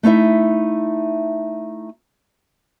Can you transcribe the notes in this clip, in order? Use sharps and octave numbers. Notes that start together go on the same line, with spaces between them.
A3 D#4 E4 E5